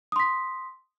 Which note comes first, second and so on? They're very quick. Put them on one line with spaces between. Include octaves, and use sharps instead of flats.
D#6 C6 B6